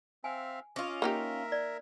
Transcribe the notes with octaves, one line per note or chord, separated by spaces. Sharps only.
C4 E5 F5 G#5
C#4 F4 D#5 D6
A#3 D#4 G4 A#4 E5
D5